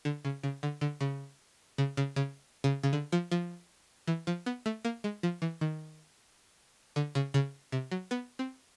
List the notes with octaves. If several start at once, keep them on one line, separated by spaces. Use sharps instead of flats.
D3
C#3
C#3
D3
D3
C#3
C#3
C#3
C#3
C#3
C#3
D3
F3
F3
E3
F3
B3
A3
A#3
G#3
F3
E3
D#3
D3
C#3
C#3
C3
F#3
B3
C4